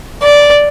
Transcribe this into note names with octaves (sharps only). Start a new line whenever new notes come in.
D5